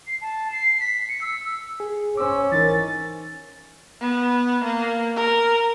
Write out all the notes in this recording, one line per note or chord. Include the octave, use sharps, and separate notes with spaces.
C7
A5
C7
B6
C#7
E6
G#4
C#4 C5 D6 E6
E3 D#4 A#4 A6
B3
A#3
A#4